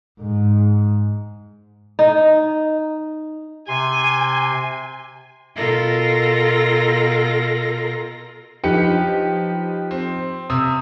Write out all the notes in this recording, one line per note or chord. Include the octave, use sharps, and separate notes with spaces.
G#2
D#4
C3 G#5 C6
B2 F4 A4 A#4 A#6
F3 D#4 G4 B4 C#7
C4
C3 D#6 E6